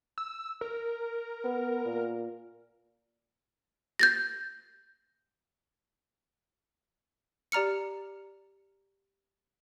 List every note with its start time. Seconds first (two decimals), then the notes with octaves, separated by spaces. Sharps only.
0.18 E6
0.61 A#4
1.44 B3
1.85 A#2
3.99 G6 A6 A#6
7.52 G4 D5 A#5 F6 C#7